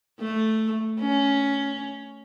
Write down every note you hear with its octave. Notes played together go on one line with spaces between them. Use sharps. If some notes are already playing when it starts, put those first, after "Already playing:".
A3
C#4